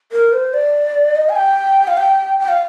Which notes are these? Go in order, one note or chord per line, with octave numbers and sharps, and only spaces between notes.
A#4
C5
D5
D#5
G#5
G5
F5
G5
G5
F5